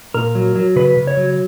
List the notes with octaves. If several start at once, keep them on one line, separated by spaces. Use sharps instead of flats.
A#2 A#4
F#3
F#3
C#3 B4
C#3
C#5
F#3